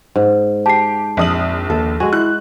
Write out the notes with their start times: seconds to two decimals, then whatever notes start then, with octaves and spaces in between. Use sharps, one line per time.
0.16 G#2
0.66 G4 A5 C7
1.17 A#1 F2 D#6 F#7
1.70 D#2 A4
2.00 G#3 F#4 G#5
2.13 E4 F#6